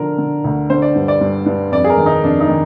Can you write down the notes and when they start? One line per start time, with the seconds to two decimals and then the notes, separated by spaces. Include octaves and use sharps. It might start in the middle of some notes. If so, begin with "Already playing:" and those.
Already playing: D3 F3 A#4
0.18 D3
0.44 D2
0.70 D3 C5
0.82 D5
0.95 G2
1.08 D5
1.21 G2
1.46 G2
1.72 F2 D5
1.84 G#4
1.90 A#4
1.98 D#3
2.06 D#4
2.24 F2 D4
2.40 D#4
2.49 D#3